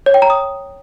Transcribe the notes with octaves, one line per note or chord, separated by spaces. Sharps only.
C#5
G5
A#5
D#6